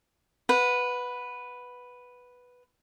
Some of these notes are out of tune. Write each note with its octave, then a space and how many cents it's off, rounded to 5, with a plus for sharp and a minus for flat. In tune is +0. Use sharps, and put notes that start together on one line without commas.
B4 +0 F#5 -20